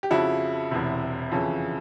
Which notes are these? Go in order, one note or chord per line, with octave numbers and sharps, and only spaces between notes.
G4
F2 C#3 F3 E4 F#4
E1 E2 C3
F2 C#3 E3